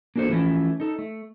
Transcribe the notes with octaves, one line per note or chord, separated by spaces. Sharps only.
A#3 D4 F#4 A4 C5
E3 F3 A3 C#4 E4
D#4 A4
A3